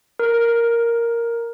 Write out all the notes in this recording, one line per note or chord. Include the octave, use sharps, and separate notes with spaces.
A#4